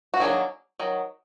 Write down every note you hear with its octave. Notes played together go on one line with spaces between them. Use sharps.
F#4
D#3 F#3 A#3 D4 G#4
D#3 F#3